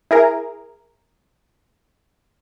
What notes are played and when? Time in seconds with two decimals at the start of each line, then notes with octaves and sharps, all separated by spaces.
0.11 E4 G#4 A#4